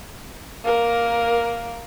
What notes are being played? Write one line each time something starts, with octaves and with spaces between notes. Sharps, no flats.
A#3 A#4